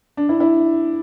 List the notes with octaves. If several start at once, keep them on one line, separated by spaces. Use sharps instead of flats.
D4
E4
E4